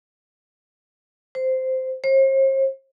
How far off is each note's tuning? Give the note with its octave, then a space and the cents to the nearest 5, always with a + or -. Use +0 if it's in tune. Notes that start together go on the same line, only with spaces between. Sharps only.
C5 -10
C5 +45